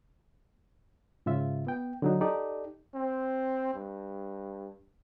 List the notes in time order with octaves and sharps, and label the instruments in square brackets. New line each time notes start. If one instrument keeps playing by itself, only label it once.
[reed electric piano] G#2 C#3 F4 E5
B3 G5
D3 F#3 D#4
D#4 G4 A4 D5
[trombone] C4
G2